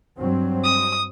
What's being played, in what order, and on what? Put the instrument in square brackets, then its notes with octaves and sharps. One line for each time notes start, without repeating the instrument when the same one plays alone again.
[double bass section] G2 F#3 C4
[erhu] D#6